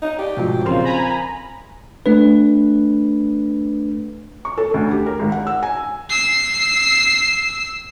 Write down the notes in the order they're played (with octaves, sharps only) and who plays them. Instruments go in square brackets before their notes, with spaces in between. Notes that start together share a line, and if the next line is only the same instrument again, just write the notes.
[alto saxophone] D#4
[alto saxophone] G4 [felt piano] D5
[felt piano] G#2 F3 F#3 [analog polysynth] B2
[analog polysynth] A#1 C#3 F4 [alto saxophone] F3 [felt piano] C4 A#4 C6
[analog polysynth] G#5 A#5 B5
[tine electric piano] A3 D4 B4
[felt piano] C#6
A4
D2
G4
A#4
G#1
F#5
E6
G#5
[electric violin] E6 C7